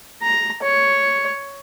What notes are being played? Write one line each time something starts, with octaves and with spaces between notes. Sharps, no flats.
A#5
C#5